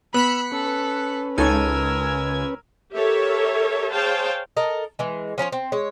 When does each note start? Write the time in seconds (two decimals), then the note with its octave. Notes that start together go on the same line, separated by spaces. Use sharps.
0.14 B3 B5 E6 F#6 B6 C#7
0.52 C#4 A4 B4
1.38 C#2 D#4 A4 A#4 C#5 G#5 E6 G#6
2.94 G4 A4 A#4 C#5 E5
3.91 G#4 C5 C#5 F5 G5 A5
4.57 A4 A#4 D#5
4.99 E3 G#3
5.38 F3 C#4 B4 C#5
5.52 C4
5.72 G#3 C#5